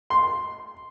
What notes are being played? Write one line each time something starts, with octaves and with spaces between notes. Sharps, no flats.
C6